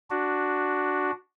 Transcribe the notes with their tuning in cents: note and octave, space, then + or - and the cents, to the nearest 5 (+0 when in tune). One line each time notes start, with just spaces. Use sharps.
D4 +0 F#4 +0